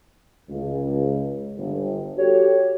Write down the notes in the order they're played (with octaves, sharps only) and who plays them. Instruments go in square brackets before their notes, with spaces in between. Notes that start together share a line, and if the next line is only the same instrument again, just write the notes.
[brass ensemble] C#2
G1
[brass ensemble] F#4 G4 A4 [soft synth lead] C#5